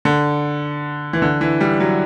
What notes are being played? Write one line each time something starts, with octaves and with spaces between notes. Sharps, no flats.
D3
E3
D3
E3
G3
F#3